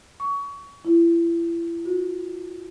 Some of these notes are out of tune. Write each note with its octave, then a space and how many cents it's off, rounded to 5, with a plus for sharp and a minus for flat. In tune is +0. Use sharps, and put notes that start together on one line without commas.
C#6 +25
E4 +35
F#4 -25